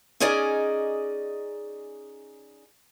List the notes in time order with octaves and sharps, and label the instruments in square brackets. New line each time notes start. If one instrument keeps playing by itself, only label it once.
[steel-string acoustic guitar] C#4 D#4 G#4 A#4 D5 D#5